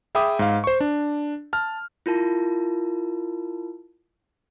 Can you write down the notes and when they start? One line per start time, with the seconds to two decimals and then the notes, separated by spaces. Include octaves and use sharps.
0.15 G#4 E5 G5 B5 D6 D#6
0.39 G#2 F5
0.64 C5 C#6
0.80 D4
1.53 A5 F6
2.06 E4 F4 A#4 A5